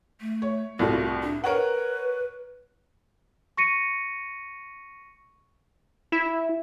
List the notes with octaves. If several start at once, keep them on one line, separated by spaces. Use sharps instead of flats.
A3
C#5
C2 A2 F4 F#4
D4
A#4 B4 C#5 F#5
C#6 A#6 C#7 D#7
E4